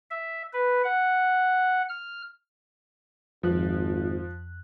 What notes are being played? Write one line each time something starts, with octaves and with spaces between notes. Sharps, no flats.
E5
B4
F#5
F6
G#1 F2 F3 F#6